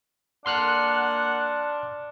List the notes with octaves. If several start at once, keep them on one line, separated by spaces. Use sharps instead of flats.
A#3 D4 F#5 C6 F6 F#6